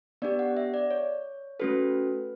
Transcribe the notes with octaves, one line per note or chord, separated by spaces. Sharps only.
B3 D4 G4 D5
F#5
E5
D5
C#5
A3 C#4 F#4 A4 B4